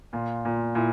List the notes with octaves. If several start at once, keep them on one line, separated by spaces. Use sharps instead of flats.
A#2 F4
A#2
A#2 E4